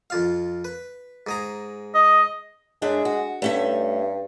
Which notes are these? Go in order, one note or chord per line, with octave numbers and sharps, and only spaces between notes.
F2 F4 F5
B4
G#2 G#4 A#5
D#5
F#2 G#3 D4 E5
F#4
G2 A3 C#4 E5